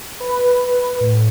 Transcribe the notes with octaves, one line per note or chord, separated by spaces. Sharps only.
B4
A2